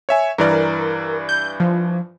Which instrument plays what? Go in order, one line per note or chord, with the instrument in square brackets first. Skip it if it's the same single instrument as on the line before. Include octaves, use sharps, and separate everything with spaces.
[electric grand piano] C#5 E5 G#5
[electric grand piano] G2 E3 D5 [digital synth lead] A#4
[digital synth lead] G6
F3